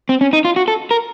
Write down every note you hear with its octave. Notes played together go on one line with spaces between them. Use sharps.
C4
C#4
D#4
F4
F#4
A4
A#4